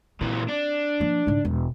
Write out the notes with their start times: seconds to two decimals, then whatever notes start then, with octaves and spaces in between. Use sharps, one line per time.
0.21 A#2 E3 C4
0.48 D4
1.00 F3 A#3
1.27 G#2 C#3
1.45 E1